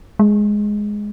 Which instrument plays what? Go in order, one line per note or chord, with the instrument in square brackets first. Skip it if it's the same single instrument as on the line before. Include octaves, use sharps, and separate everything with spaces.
[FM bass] G#3